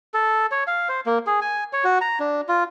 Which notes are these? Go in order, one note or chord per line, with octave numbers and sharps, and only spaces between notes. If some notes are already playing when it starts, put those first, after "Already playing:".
A4
C#5
F5
C5
A#3
G#4
G#5
C#5
F#4
A#5
D4
F4